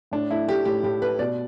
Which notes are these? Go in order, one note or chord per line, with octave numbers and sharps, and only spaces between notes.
A2 D4
A3 E4
A3 G4
A2 G4
A2 G4
A3 B4
B2 D5